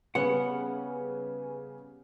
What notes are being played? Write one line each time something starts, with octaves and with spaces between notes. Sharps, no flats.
C#3 G3 B3 C#4 B4 F#5 G#5